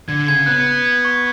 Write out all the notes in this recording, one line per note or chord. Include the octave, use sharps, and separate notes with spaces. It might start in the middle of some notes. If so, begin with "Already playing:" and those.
D3 G#6
C#3 G#6
B3 F#6
F#6
G#6
C#6